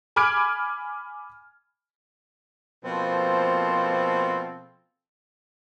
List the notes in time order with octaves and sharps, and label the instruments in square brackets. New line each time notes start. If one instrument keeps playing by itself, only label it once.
[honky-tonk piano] G#5 B5 D6 F6 G#6 D7
[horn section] B2 F3 A#3 C4 A4 C5